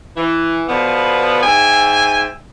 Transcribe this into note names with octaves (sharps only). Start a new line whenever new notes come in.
E3
B2 D3 F3 B3
G#2 E5 G5 G#5